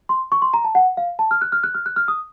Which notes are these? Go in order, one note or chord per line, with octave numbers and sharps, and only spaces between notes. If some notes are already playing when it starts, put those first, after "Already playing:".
C6
C#6
C6
A#5
A5
F#5
F5
A5
F6
F#6
F6
F#6
F6
F#6
F6
D#6